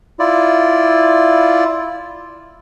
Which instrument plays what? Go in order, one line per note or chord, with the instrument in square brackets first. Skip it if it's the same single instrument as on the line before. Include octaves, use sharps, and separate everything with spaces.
[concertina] E4 F4 D5